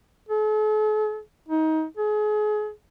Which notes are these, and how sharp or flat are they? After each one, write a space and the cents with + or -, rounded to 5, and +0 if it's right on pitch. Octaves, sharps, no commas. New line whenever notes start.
A4 -45
D#4 +25
G#4 +35